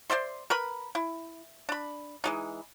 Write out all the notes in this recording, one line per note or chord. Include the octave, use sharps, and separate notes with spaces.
C5 D5 E5 C6
A#4 B4 B5
E4
D4 B5
E3 G#3 D#4